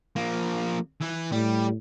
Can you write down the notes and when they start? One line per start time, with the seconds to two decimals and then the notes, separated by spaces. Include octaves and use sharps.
0.16 F3 A#3
1.01 E3
1.32 A2 G3